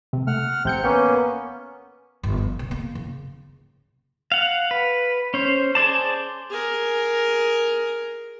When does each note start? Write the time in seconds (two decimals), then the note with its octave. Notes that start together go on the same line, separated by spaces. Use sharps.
0.13 C3
0.27 A3 F#5 F6
0.65 A1 C3 C4 G6 C#7
0.84 A#3 B3 C#4
2.23 G1
2.37 F3
2.59 C#3
2.71 A#3
2.95 C#3
4.32 F5 F#5
4.71 B4
5.34 C#4 C5
5.75 G#4 C5 D5 A5
6.50 G#4 A#4